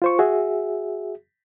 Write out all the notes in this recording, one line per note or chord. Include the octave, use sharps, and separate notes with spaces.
F4 C5 C#6
F#4 G#4 E5